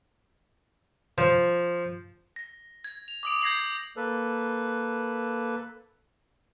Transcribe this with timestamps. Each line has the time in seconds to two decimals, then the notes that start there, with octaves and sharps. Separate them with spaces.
1.18 F3
2.36 A#6
2.84 G#6
3.08 F7
3.23 D6 D#6 D7
3.42 G6 G#6 A#6 C7 F#7
3.97 A#3 A4 B4